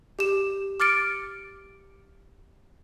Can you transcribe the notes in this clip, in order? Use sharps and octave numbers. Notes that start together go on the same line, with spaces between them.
G4 E7
D6 F6 A6 C#7 D7